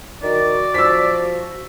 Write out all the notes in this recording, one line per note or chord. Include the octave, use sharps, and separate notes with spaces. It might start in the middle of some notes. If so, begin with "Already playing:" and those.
D#3 F#4 D5
F3 E6 B6